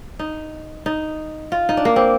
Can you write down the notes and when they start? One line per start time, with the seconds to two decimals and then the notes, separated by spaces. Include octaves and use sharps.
0.19 D#4
0.86 D#4
1.52 F4
1.69 D#4
1.77 D4
1.85 A#3
1.96 C4